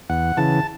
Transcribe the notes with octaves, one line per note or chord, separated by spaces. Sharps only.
E2 F#5
C#3 E3 A5